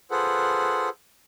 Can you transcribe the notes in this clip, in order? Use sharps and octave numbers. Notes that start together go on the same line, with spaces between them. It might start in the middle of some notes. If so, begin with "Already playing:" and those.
F4 G#4 A4 B4 C5 F#5